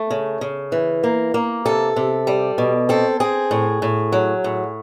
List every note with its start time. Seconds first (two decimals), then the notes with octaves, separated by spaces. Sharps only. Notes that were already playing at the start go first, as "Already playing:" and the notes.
Already playing: A3
0.10 C#3
0.41 C#3
0.72 E3
1.04 A#3
1.34 A#3
1.65 C3 A4
1.96 C3
2.27 G3
2.58 B2
2.89 C4 A4
3.20 C4 G#4
3.51 A2
3.82 A2
4.12 F#3
4.44 A2